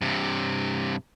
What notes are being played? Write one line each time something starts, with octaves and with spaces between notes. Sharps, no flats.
G2 C3